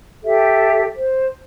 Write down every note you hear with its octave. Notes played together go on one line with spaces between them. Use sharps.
G4 A4 E5
C5